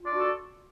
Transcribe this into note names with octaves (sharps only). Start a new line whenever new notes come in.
D4 F4 F#4 A4 D5